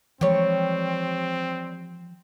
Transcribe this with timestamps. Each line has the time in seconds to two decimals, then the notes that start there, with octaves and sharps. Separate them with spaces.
0.21 E3 F3 G3 G#3 C4 C#5